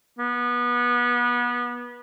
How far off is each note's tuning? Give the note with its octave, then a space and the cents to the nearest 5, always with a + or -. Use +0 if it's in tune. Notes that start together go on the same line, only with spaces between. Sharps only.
B3 -25